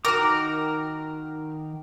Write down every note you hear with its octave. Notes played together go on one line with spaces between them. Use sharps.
D#3 F#4 A#4 G5 D6